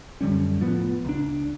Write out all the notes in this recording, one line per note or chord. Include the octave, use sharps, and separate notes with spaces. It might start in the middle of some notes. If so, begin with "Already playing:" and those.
F#2 D3 G3 C#4
A2 F3 B3
C#2 D4